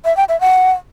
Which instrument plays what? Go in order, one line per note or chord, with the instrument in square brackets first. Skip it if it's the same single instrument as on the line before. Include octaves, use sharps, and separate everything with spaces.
[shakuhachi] E5
G5
E5
F#5